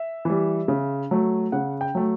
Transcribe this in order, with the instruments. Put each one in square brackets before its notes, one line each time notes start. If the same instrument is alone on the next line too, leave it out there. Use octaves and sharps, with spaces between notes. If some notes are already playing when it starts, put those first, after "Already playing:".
Already playing: [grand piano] E5
E3 G3
C#3
F#3 A3
C#3 F#5
G5
F#3 A3